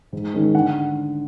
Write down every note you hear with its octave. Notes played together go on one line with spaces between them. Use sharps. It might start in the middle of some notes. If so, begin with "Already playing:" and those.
G#2
D#3 G#3 C#4
D3 F#5